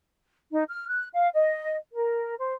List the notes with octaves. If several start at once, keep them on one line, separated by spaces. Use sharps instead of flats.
D#4
F6
F#6
F5
D#5
A#4
C5